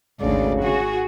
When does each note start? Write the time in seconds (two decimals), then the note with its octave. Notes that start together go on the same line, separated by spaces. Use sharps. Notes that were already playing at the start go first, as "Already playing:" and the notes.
0.21 G#1 D2 C#3 D5
0.63 F#4 G#4